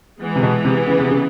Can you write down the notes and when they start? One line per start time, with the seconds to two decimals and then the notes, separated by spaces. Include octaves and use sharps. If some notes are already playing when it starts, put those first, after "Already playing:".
0.20 E3 G#3 B3
0.36 C3
0.42 B2
0.65 C3
0.87 C#3
0.99 C3
1.10 C#3